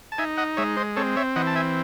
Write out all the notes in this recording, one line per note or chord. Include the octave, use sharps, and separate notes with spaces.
A5
D#4 E5 G#5
D#5 F#5
G#3 C#5 E5
C5 D#5
C4 A4 C#5
C#5 E5
E3 D#5 F#5
A5
E5 G#5